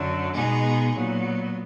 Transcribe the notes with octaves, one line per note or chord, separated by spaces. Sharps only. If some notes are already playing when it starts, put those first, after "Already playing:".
Already playing: F#2 D3 F#3
B2 G#3 B3 D#4 G#4
A#2 F#3 B3